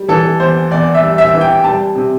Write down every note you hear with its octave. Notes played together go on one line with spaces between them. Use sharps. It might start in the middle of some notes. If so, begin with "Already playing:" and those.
Already playing: G3
E3 A4
E2 C5
E2 D5
E5
G3
E5
E3
G5
G3 A5
C3